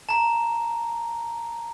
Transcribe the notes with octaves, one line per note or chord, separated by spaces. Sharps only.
A5 A#5